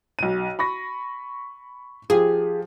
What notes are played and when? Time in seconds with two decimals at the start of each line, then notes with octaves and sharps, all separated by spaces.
0.19 B1 D#7
0.59 B5 C#6 A#6
2.10 F3 G4 G#4